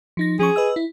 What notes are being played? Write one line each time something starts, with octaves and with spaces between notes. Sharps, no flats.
F3 D#4 A#6
F3 C#4 G#4 C#6
B4 D#5 E6
E4